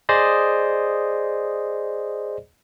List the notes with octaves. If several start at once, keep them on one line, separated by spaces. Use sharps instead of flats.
G#4 C5 D5 D#5